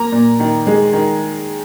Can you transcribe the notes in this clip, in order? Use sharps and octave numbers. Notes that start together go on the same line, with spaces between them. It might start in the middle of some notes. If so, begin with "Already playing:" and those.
Already playing: A#3 A#5
A#2
D#3
G#3
D#3